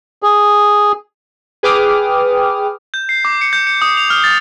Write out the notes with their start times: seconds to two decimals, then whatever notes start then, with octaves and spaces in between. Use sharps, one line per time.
0.23 G#4
1.63 G#4 B4 G5 D6 D#6 F6
2.94 G6
3.09 C7
3.25 D6
3.41 C#7
3.53 G6
3.67 C#7
3.82 D#6
3.97 F7
4.10 F6
4.24 A6